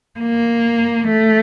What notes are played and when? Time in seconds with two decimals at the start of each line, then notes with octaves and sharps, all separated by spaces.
0.20 A#3
1.08 A3